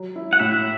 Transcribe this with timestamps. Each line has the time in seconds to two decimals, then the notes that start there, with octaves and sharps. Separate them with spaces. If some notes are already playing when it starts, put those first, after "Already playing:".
Already playing: F#3
0.16 E4
0.33 F#5
0.39 A2 E5